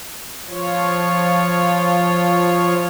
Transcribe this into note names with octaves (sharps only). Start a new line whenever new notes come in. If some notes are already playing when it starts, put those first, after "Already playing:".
F3 F4 C#5